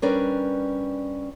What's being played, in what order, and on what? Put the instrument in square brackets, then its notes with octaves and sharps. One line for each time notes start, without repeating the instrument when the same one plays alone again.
[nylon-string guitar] G3 C#4 D4 A#4 B4 D5